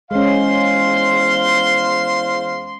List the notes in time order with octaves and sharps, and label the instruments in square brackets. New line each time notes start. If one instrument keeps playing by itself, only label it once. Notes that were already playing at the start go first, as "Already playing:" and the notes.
[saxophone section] E2 C5 F5 [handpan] G#3 C#4 [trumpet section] C6